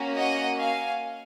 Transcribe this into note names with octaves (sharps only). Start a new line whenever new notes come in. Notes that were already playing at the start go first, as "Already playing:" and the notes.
Already playing: A#3 C#4 F#4
D#5 F#5
F5 G#5